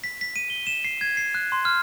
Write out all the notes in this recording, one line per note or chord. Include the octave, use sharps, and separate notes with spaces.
B6
B6
D#7
G7
E7
C7
G#6
C7
F#6
C6
F6